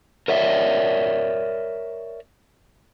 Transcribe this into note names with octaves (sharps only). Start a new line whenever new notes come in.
A#4 C#5 D5 E5